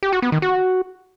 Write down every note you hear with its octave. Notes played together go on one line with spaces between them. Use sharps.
G4
F#4
B3
D#3
F#4